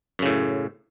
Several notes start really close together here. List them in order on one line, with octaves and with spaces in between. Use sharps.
F#2 C#3 A2